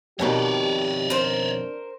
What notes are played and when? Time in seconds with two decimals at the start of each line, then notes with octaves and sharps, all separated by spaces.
0.19 F2 B2 D#3 G4 C#5 D5
1.10 D4 A#4 C5